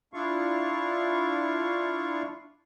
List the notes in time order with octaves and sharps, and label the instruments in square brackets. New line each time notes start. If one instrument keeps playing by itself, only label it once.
[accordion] D4 E4 F4 F5 C#6